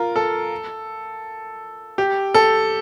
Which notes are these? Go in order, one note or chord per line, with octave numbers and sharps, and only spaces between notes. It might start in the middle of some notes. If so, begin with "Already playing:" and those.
Already playing: F4 A#4
A4
G4
A4